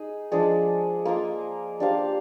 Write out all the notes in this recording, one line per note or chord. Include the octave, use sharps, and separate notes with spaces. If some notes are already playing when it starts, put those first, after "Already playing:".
Already playing: D#4 G#4 D#5
F3 G#3 D4 G#4
A#3 F4 A#4 D#5
D4 G4 C5 F5